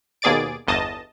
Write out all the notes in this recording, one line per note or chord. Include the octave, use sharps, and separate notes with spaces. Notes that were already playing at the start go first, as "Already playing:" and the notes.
D#2 B2 G#4 D5 A6 D7
G1 E2 D#5 A5